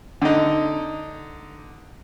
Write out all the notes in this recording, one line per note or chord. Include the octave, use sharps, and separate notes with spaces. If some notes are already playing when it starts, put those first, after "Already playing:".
D3 D#4